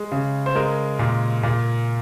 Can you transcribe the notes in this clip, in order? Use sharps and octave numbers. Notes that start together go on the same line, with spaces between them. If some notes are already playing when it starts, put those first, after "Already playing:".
Already playing: G#3
C#3
C5
G#3 A#4
A#2
A#2